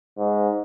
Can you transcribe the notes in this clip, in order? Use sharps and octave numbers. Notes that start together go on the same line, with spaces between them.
G#2